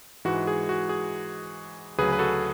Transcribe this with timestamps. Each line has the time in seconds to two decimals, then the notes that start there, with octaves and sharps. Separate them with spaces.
0.25 G#2 E3 G#3 F#4
0.47 G#4
0.69 F#4
0.89 G#4
1.99 D2 C#3 F#3 G#4 B4
2.12 B4
2.19 F#4 A4